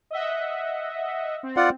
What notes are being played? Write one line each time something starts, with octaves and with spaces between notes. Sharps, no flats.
D#5 E5 F#5
C4
F4 D5 F#5